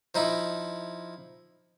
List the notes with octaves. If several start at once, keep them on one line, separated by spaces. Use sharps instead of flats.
F3 D#4 E4